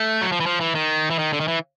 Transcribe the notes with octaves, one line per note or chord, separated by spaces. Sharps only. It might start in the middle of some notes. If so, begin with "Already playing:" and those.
Already playing: A3
F#3
F3
E3
F3
E3
D#3
E3
D#3
D3
D#3
E3